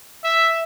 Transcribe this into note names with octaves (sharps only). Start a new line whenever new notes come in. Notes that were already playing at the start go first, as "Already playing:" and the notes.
E5